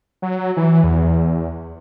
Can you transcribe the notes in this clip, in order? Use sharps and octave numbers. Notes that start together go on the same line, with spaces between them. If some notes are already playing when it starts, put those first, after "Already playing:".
F#3
E3
E2